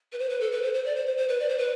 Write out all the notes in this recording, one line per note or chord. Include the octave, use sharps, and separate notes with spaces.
B4
C5
B4
A4
B4
C5
C5
D5
C5
C5
C5
B4
D5
C5
B4